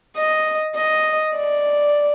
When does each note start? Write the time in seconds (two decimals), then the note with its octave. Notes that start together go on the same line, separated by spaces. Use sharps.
0.17 D#5
0.76 D#5
1.36 D5